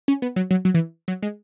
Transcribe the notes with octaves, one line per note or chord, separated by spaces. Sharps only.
C#4
B3
F#3
F#3
F#3
E3
F#3
G#3